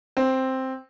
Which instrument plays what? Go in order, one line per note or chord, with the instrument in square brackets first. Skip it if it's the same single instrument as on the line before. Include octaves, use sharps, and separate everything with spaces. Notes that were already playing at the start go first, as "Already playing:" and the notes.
[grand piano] C4